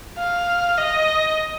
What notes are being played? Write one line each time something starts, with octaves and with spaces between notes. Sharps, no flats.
F5
D#5